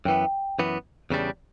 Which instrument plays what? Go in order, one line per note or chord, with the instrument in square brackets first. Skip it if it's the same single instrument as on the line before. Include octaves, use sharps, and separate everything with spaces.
[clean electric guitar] F#2 E3 B3 [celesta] G5
[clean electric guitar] F#2 E3 B3
E2 C#3 G3 D4